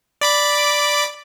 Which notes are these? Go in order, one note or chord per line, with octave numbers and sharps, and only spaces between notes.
D5 B5 D6